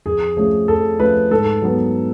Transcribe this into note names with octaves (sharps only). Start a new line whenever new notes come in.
F2 G#4
F3 A3 C#4 G#4
F2 A4
F3 A3 C#4 B4
G#2 A4
F#3 B3